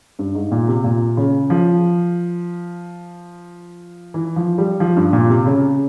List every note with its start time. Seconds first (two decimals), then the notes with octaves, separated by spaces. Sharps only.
0.19 G2
0.35 G#2
0.52 A#2
0.68 C3
0.84 A#2
1.17 C#3
1.50 F3
4.14 E3
4.36 F3
4.58 G3
4.80 F3
4.97 G2
5.13 A#2
5.30 C3
5.46 C#3